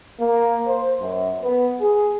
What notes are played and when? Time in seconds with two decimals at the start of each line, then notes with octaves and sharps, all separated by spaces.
0.19 A#3
0.67 C5
1.01 F#2
1.43 B3
1.80 G#4